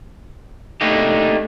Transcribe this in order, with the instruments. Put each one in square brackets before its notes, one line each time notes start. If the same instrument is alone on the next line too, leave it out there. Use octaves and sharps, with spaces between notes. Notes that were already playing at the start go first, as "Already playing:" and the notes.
[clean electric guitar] A3 A#3 D4 D#4 G4